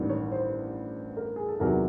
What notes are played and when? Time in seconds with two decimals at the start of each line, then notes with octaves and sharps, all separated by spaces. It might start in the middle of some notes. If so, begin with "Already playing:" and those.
Already playing: A1 G2 D#3
0.09 C#5
0.32 C5
1.17 A#4
1.36 G#4
1.49 A4
1.60 E2 C3 D#3 F#3 A#4